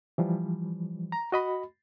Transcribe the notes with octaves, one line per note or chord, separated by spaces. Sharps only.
E3 F3 G3
A#5
F#4 D#5 B5